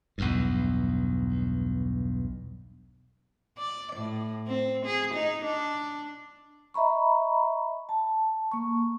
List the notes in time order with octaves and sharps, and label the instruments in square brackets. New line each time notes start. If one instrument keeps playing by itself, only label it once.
[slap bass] B1 E2 G2
[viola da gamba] D5
A2
C4
G#4
D#4
D4
[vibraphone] D#5 E5 A#5 B5 C#6
A5
A#3 C#6